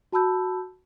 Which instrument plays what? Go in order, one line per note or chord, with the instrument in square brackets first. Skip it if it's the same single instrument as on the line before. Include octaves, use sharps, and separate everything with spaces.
[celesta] F#4 A5 B5 E6 G6